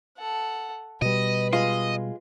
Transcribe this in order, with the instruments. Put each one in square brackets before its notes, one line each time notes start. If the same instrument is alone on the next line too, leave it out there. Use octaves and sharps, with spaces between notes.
[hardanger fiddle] A4 F#5
[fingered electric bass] B2 G3 [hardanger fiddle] B4 [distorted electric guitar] D#5
[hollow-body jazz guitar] G#3 F4 [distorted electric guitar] D#5